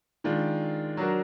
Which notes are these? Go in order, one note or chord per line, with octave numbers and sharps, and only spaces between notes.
D#3 G#3 D4 F4
F#3 D4 F#4 A#4